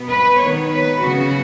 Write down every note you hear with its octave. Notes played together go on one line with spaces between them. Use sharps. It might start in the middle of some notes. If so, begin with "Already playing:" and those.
Already playing: B2 B3
B4
D#3 B3 C#5
B4
C#3 F#3 B3 F#4